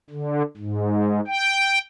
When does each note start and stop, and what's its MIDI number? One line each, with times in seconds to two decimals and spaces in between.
0.10 0.42 50
0.57 1.21 44
1.28 1.79 79